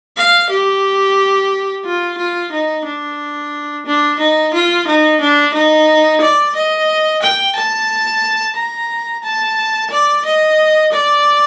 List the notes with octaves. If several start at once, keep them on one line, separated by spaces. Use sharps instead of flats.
F5
G4
F4
F4
D#4
D4
D4
D#4
F4
D#4
D4
D#4
D5
D#5
G5
A5
A#5
A5
D5
D#5
D5